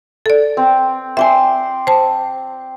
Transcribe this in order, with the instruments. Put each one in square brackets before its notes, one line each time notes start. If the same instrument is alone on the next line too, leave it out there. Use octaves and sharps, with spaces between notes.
[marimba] A4 D5
[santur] C4
[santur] C4 D5 C6 [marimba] E5 G5 G#5
[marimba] C5 A5